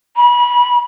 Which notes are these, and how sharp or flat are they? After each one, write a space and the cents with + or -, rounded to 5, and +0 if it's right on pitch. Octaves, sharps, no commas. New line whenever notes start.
B5 -30